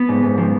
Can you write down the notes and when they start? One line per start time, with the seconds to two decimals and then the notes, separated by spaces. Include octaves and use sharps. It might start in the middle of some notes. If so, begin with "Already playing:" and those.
Already playing: B3
0.09 G#2
0.23 G#2
0.38 F3